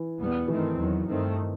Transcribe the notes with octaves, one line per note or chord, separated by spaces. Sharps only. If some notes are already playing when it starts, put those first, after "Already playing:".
Already playing: E3
E2 B2 G3 B3
G2 D#3 E3 A3 C4
E2 D#3 F#3
G2 D#3 A3 C4